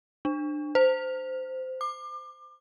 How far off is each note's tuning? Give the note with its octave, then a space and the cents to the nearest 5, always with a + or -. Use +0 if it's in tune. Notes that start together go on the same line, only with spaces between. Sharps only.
D4 +25
C5 -15
D6 +30